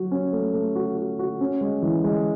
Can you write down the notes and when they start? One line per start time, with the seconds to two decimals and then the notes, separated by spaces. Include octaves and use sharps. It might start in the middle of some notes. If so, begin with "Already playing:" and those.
Already playing: F#3 F#4
0.11 C#4
0.33 A3
0.54 A3
0.75 F#4
0.97 F#4
1.19 F#4
1.41 C#4
1.61 G#3
1.82 E3
2.04 G#3